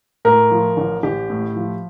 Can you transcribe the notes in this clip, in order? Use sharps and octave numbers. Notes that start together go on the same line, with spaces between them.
A2 A#4
F3
A1
A1 G4
A2
F3